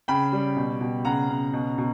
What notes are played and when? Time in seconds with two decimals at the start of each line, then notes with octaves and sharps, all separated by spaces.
0.08 C#3 G5 B5
0.33 G3
0.56 B2
0.81 B2
1.05 C#3 F#5 A#5
1.29 C#3
1.53 B2
1.78 B2